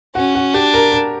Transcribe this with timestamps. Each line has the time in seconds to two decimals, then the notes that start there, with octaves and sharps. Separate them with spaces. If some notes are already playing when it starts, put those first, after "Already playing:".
0.15 C#4 F#4
0.35 F#4
0.54 D4 G4
0.74 A#4
0.92 A#4